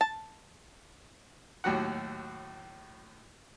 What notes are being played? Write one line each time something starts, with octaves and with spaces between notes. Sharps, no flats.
A5
D#2 A2 F#3 F#4 G4 F#5